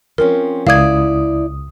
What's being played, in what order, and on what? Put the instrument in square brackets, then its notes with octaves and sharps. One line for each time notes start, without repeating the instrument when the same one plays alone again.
[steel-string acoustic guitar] F3 C4 C#4 [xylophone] A#4
[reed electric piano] C#2 D#6 [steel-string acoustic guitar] E4 D5 [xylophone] F5 G#6